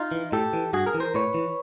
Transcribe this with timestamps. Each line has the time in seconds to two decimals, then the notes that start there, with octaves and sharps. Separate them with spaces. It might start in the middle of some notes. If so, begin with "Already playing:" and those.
Already playing: D#4 F4
0.12 E3
0.32 A2 G4 A4
0.53 E3
0.73 G2 F#4 G#4
0.86 G#4 A#4
0.94 E3
1.00 A#4 C5
1.14 A2 B4 C#5
1.34 E3